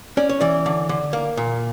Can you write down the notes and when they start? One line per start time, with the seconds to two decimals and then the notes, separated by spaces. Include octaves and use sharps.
0.17 C#4 D5
0.29 C#5
0.41 E3 D5
0.66 D3
0.89 D3
1.13 A#3
1.37 A#2